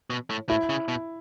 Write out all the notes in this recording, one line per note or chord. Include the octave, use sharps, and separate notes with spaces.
B2
A2
A2 E4
C#3
B2